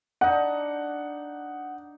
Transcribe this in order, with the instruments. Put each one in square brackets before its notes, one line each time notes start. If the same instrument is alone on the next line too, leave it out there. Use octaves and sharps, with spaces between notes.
[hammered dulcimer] D4 D#4 [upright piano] F#5